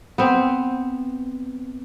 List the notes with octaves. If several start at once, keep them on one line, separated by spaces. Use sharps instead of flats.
B3 C4